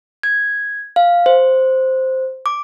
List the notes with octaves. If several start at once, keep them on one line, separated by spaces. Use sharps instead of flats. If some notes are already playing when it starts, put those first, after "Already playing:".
G#6
F5
C5
D6